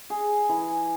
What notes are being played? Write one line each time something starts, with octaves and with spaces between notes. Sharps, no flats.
G#4
E3